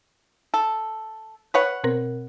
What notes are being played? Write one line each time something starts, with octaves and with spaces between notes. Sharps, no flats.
A4
B4 C#5 F#5
B2 C4 A#4